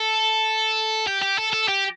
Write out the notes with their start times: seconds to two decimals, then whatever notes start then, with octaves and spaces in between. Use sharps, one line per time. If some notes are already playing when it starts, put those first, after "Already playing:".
Already playing: A4
1.07 G4
1.22 G4
1.38 A4
1.53 A4
1.68 G4